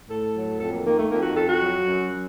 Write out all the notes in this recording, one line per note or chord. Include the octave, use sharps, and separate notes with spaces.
A2 A4
F#3
F2 A4
A#3
D#3 A#3
A3
F2 A#3
F#4
F2 A4
F#4
F#3
F#2
F#3